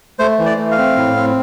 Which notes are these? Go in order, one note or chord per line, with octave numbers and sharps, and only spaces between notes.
A3 C5
E3
D5
A3
F5
C4
A2
C4